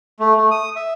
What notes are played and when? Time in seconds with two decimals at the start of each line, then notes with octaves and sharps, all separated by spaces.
0.20 A3
0.37 A3
0.51 D#6
0.76 E5